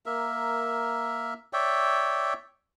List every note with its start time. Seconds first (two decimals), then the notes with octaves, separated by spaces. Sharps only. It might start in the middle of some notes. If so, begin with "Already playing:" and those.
0.06 A#3 A#4 E5
1.53 C#5 D5 E5 G5